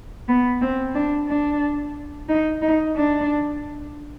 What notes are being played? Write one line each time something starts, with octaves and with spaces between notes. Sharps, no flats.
B3
C4
D4
D4
D#4
D#4
D4